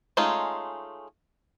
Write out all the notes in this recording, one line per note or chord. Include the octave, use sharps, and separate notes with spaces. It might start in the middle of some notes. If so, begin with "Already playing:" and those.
G#3 A3 C#4 D#4 F4